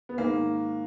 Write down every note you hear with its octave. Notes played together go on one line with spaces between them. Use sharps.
B3
G#2 D#3 A#3